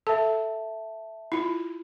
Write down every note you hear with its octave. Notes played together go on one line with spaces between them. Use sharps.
A4 E5 A5
E4 F4